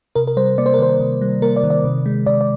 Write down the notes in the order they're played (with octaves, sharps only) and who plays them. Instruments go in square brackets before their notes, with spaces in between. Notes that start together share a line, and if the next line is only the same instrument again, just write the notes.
[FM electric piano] C3 A#4
A#4
G3 C5
A#3 D5
C5
A#4
D#3 C5
C3
G3
A#3 A#4
D5
D#3
D5
C3
G#3
C3 D5
D5